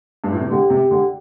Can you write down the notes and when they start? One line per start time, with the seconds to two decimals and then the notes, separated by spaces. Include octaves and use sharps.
0.24 G2
0.32 A2
0.40 C3
0.50 D3 G4
0.70 C3
0.91 D3